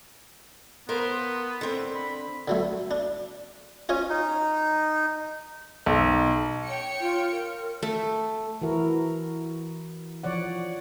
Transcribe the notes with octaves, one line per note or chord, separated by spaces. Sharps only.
B3 A#4 C5 F5
D3 C4
B5
D3 F#3 A3
D4
C#4 F4 C#5 D#5
D#4
B1
C#5 G5 C#7
F4
A#4
A3
E3 E4 F#4 A#4
F3 C#5 D5 F#5